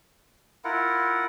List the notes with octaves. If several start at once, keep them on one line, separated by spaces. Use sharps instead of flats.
E4 F4 A#4 F#5